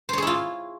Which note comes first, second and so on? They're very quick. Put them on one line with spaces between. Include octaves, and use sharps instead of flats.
C5 C#5 G#4 E4 F4